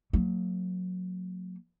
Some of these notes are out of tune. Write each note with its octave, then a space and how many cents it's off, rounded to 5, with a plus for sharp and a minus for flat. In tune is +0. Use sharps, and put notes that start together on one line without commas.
F#3 -20 A#3 -40